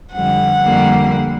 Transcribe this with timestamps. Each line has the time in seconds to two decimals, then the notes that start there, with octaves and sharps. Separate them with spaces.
0.15 F2 D3 G3 F#5
0.62 F2 D3 G3 A#3